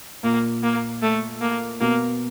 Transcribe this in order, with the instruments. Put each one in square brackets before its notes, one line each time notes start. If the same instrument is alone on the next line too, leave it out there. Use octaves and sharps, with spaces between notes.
[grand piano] A#2 [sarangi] A#3
[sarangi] A#3
A3
A#3
[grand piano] B2 [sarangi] A#3